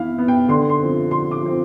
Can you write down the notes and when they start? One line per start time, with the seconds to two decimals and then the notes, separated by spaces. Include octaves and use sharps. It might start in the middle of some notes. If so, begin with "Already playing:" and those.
Already playing: E3 B3 E5 F5
0.18 B3
0.28 G5
0.48 D3 C6
0.69 C6
0.80 F3 C4
1.11 D3 C6
1.31 D6
1.43 F3 C4